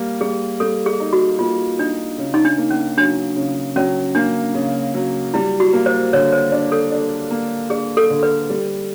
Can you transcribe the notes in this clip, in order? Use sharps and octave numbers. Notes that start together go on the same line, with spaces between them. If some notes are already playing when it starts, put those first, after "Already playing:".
Already playing: G3 A#3
G3 G#4
G3 A4
G#4
D#4
F#4
A#3 F4
D4 D#4
C#3
D#4
D4
A#3
C#4
F#3 D4
C#3
F#3 C#4
A#3 D4
C#3
F#3
G3 E4
F#4
A#3
C5
D3 C#5
C5
D4
A4
D4
A#3
D4 G#4
A4
D3
B4
G3